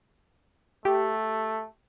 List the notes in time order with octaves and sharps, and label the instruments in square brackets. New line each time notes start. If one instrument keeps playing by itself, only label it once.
[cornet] A3 [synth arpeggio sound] G4